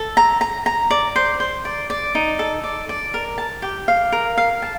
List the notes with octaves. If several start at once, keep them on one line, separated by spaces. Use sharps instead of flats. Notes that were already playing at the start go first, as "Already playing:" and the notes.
Already playing: A4
A#5
A#5
A#5
D5
C5
C5
D5
D5
D#4
A4
D5
D5
A#4
A5
G4
F5
A#4
F5
A5